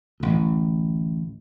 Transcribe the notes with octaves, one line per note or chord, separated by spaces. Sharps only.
A1 D2